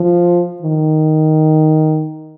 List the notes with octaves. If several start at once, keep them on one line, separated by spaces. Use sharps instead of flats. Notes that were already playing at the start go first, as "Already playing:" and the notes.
Already playing: F3
D#3